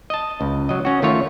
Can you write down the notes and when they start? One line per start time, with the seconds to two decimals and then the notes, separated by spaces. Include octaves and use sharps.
0.10 D#5 A5
0.41 C#2
0.69 F#3 D#5
0.85 C#4 F#4
1.02 D#3 A3 F4 C#5